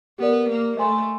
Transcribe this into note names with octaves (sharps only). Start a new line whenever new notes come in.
B3 G4 A#4 D5
A#3
A3 C5 D#5 G#5 C6